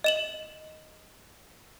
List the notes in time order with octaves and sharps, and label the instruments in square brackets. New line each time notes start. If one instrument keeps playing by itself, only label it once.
[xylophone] D#5 E7 F#7